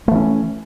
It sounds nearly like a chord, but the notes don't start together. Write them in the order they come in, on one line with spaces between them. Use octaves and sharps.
A3 E3 C#4